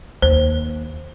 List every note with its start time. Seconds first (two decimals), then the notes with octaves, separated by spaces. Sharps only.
0.22 D#2 C5